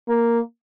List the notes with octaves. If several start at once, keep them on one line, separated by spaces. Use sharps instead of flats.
A#3